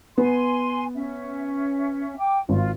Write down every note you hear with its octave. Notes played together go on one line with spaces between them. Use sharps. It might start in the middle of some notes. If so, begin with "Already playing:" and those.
B3 G#5 C6
C#4 E5
G5 D6
G#1 F4